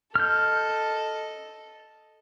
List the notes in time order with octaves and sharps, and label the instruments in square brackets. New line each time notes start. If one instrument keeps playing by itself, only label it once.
[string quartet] A4 D#5 [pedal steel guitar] F6 G6